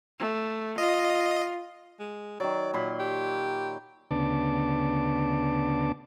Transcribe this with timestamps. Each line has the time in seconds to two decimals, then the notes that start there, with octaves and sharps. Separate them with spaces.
0.19 A3
0.78 F4 D#5
2.00 G#3
2.40 D#3 F#3 D5
2.73 A#2 F#3 B5 C6
2.99 G4
4.11 D2 C#3 B3 D4 A5 D6